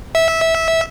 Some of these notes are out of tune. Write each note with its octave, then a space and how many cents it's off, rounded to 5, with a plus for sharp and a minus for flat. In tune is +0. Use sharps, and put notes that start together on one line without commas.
E5 -15